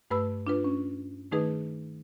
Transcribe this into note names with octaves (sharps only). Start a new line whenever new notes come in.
G2 A3 B4 B5 E6
D4 F4 B4
C#4
D#3 A3 D#4 G#4 B4